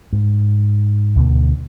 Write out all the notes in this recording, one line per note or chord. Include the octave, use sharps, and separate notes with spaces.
G#2
D2 B2 D3 A#3